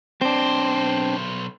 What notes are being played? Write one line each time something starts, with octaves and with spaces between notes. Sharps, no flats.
B1 C4 D4 C5